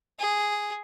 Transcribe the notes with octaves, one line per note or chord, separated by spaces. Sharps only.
G#4